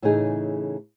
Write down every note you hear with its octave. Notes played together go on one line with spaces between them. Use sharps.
A2 C#3 E3 A3 D#4 G#4